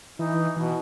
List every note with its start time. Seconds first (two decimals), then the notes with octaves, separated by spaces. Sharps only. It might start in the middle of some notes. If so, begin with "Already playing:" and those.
0.19 E3 D#4
0.56 B2 E3